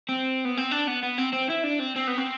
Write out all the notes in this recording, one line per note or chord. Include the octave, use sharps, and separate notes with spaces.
C4
B3
C4
D4
B3
B3
C4
C4
E4
D4
C4
C4
B3
C4